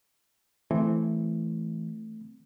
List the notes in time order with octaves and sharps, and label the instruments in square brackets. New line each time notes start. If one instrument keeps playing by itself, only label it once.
[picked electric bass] E3 [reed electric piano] A3 C4